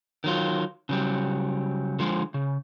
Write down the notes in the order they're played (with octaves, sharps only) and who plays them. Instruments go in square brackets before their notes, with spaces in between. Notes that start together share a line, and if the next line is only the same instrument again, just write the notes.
[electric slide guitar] D#3 F#3 F4
C#3 F#3 G3
D3 F3 G#3
C#3